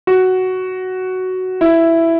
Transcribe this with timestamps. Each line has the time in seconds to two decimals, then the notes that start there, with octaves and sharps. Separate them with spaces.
0.07 F#4
1.61 E4